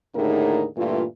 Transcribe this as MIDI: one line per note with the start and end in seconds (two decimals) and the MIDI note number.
0.15 0.66 39
0.15 0.66 45
0.15 0.66 50
0.15 0.66 63
0.15 0.66 68
0.15 0.66 70
0.77 1.04 43
0.77 1.04 46
0.77 1.04 52
0.77 1.04 57
0.77 1.04 65